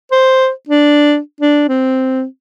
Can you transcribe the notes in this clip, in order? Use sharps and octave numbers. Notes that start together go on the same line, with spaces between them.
C5
D4
D4
C4